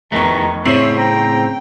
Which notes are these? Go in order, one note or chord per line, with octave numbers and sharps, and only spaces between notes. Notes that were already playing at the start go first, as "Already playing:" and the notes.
F1 E2 G2 D#3 E3 A3 A#5 C#6
A2 C#3 C4 C#5 E5 C7 F#7
G5 A#5